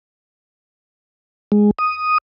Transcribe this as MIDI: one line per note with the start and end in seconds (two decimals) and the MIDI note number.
1.52 1.71 56
1.79 2.18 87